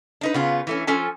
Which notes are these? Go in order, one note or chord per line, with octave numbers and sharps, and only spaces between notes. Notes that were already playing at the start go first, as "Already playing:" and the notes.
D4 D#4 B4
C#3 B3 F4
E3 A3 C#4
F3 C#4 A4 G#5